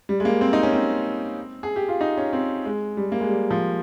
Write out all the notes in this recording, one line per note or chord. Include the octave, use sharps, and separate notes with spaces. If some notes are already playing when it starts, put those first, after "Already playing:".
G3
G#3
A#3
C4
D#4
C#4
C4
G#4
G4
F4
D#4
C#4
C4
G#3
G3
A#3
G#3
G3
F3